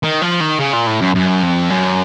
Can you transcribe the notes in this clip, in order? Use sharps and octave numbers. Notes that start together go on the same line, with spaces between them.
D#3
F3
D#3
C#3
A#2
A2
F#2
F#2
F2
F#2